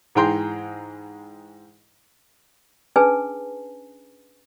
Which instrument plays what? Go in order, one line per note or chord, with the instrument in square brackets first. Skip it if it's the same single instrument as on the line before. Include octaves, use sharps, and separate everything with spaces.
[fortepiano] G#2 E3 G#4 G5 A#5 C6
[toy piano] C#4 D4 G#4 B4 G#5 A5